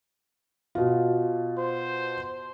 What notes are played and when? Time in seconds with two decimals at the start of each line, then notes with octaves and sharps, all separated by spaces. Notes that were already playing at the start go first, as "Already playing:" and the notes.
0.75 B2 F4
1.59 C5